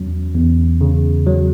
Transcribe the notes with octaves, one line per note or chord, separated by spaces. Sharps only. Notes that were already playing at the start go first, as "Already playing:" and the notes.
Already playing: E2 F#3 C#4
E2
C#3
F#3